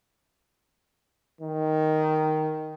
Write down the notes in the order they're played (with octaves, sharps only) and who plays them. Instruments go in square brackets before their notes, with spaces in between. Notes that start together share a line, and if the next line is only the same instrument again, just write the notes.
[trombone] D#3